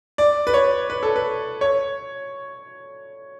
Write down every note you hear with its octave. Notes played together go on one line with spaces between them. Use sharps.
D5
B4
C#5
B4
A4
B4
C#5